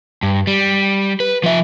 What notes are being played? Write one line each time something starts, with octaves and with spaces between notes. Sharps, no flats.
G2
G3
B4
F3 E5